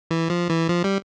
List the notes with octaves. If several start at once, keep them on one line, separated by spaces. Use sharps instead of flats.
E3
F3
E3
F3
G3